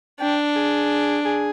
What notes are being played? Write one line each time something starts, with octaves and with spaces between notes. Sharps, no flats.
D4 G5
G#4
G#4